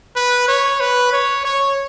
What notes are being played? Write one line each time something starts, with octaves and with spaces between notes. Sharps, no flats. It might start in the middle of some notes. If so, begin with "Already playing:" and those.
B4
C#5
B4
C#5
C#5